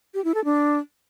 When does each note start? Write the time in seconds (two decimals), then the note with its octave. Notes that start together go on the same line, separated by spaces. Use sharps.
0.14 G4
0.24 E4
0.34 A4
0.45 D4